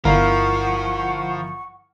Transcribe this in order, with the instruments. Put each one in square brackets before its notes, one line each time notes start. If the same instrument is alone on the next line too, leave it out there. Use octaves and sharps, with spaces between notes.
[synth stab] G1 [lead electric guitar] F3 [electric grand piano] E4 A#4 F5 [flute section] F#5 C#6